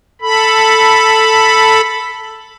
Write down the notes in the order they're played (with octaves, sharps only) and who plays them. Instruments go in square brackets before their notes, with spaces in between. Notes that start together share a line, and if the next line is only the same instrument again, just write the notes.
[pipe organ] A4 B5